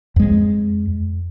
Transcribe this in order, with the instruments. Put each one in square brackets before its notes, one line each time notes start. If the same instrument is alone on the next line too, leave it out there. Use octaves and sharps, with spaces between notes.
[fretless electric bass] F2 G#3